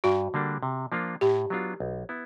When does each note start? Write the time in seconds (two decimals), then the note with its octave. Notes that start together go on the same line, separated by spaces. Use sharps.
0.04 G2 F#4
0.34 D3 G3 A#3 D4
0.63 C3
0.92 F3 A#3 D4 F4
1.21 A2 G4
1.50 F#3 B3 D4 F4
1.80 B1
2.09 B3 E4